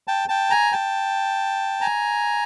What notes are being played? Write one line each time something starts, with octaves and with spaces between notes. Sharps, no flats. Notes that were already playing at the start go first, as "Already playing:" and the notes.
G5 A5
G5 A5
G#5 A#5
G5 A5
G#5 A#5